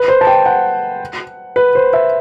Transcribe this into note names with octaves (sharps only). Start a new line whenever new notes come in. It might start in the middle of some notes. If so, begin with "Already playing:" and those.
Already playing: B4
C5
A5
G5
F#5
B4
C5
E5